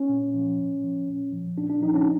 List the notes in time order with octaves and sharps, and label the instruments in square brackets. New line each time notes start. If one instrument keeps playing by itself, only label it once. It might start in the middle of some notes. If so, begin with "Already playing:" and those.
Already playing: [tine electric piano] C#4
A#2
F3
A2
F3
A#2
F3
A#2 D4
D4
F3 D#4
C#4